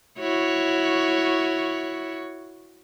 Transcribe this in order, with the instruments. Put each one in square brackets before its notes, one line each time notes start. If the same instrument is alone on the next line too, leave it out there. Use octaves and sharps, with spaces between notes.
[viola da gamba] E4 F#4 C#5